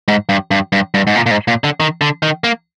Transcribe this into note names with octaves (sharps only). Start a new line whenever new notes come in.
G#2
G2
G2
G2
G2
G#2
A#2
A#2
G#2
A#2
D3
D#3
D3
D#3
A#3